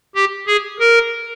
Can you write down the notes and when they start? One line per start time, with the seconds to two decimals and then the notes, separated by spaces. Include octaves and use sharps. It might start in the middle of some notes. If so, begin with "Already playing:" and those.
0.15 G4
0.47 G#4
0.79 A#4